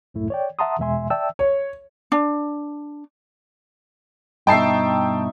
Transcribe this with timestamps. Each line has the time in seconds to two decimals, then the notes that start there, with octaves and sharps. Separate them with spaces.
0.14 C#2 F#2 A2 A3 E4
0.30 C#5 D5 G5
0.59 E5 F#5 A5 A#5 C6 D#6
0.79 E2 B2 G#3 E5 G#5 C6
1.10 D5 E5 G5 A5 E6
1.39 C#5
2.12 D4
4.47 G2 B2 D#4 E5 G5 A5 C7